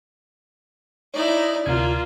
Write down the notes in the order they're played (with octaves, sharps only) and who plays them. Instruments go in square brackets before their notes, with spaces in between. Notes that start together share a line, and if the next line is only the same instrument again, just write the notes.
[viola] D#4 [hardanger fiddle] E4 D5 [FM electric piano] C#5
[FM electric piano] D2 C3 G#6 [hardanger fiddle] A#3 [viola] F4